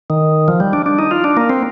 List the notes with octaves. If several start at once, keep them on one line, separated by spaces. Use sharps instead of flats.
D#3
F3
G3
D4
D4
D#4
F4
D4
A#3
C4